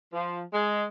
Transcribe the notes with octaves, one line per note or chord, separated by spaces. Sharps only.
F3
G#3